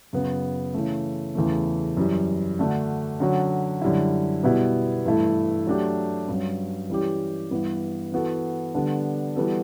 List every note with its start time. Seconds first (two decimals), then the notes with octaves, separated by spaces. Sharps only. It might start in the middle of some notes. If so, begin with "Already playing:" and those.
0.13 F#2 C#3 F#3 B3
0.74 C#3 E3 A3
1.35 E2 C#3 E3 A3
1.97 F#2 E3 G3
2.59 D3 A3 D4 F#4
3.20 D3 F#3 C#4 F#4
3.81 F#2 D3 G3 C#4 E4
4.44 B2 G3 B3 E4
5.05 G2 E3 A3 E4 A4
5.67 F#3 A3 D4 G4
6.28 G2 F#3 C#4
6.90 E3 G3 C#4 G4
7.51 G2 E3 B3
8.12 E3 B3 F#4 A4
8.74 D3 G3 B3 D4 A4
9.36 E3 G3 B3 F#4 A4